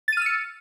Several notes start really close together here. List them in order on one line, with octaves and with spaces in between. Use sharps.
A6 D#7 F6 E6 C#7